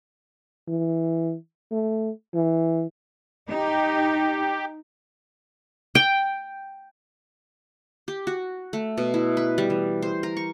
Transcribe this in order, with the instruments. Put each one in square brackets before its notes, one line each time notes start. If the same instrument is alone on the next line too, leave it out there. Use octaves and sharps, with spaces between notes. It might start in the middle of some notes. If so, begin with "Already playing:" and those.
[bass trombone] E3
A3
E3
[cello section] D#4 [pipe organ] G4
[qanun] G5
G4
F#4
A3
B2
E4
B4
G3
E3
C5
A#4
C#6